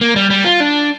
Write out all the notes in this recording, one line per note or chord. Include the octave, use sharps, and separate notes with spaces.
A#3
G3
G3
F4
D4